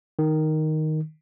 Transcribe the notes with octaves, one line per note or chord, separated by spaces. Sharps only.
D#3